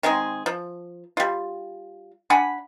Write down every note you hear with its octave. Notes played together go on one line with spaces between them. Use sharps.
D#3 G#3 C4 G#4
F3
G3 F4
D4 F#5 G#5 B5